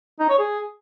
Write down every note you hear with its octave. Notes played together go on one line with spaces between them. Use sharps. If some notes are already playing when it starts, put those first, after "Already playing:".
D#4
C#5
G#4